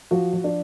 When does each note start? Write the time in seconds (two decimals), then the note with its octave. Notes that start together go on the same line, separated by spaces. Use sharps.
0.11 F3 F#4
0.33 F3
0.44 D4